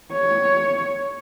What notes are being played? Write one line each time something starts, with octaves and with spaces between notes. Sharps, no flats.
C#5